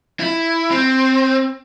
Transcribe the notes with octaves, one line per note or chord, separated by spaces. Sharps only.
E4
C4